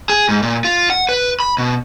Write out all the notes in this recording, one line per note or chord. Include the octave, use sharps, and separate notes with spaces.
G#4
G#2
A#2
F4
F#5
B4
B5
B2